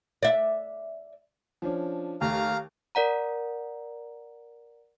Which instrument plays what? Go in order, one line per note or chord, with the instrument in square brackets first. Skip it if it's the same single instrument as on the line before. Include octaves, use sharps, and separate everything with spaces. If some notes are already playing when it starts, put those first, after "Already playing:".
[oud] D5 E5
[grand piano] F3 C#4 D4
[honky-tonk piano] D#2 [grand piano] A3 [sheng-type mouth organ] F5 A#5 F6
[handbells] A#4 D5 F#5 A#5